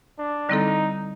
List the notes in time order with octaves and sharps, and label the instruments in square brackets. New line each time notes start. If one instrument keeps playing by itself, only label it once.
[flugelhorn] D4
[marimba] D3 G3 C4 E4 A4 [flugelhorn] D#4